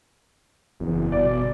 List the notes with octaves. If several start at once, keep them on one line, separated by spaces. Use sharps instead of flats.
F#1 E2
G1 B2 D5